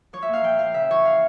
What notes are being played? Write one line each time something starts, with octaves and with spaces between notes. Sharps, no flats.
F3 C#5
E5
A#2
F5
F3 G5
F3 F5
C#3 E5
E3 C#5
F5